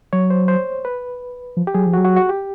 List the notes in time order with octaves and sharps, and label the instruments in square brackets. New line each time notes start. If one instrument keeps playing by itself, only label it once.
[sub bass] F#3 [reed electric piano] C#5
[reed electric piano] C5
C5
B4
[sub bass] F3
[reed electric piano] G4
[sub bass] F#3 [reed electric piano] G#4
[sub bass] F3
[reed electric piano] F#4
[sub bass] F#3
[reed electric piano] F#4
F#4
G4